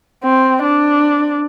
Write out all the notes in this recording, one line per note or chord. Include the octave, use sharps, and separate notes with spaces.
C4
D4